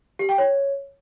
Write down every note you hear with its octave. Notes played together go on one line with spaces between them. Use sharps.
G4
G5
C#5